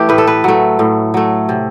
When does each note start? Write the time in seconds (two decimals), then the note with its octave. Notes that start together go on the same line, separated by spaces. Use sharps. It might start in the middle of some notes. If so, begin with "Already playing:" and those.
Already playing: E3 A3 G4
0.09 A2 B4
0.18 A4
0.27 B4
0.44 F#3 A3
0.79 A2
1.14 F#3 A3
1.49 C3